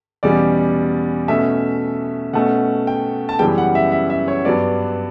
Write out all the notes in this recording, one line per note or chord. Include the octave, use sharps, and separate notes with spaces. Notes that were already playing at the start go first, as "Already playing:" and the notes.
E2 B2 G3 C#4 D5
B2 A3 C#4 E5
B2 A3 C#4 F#5
G5
A5
F#2 C#3 E3 G3 B3 G5
F#5
E5
E5
E5
C#5
G2 F#3 B3 D5